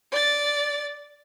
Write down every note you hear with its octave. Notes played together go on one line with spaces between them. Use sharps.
D5 A6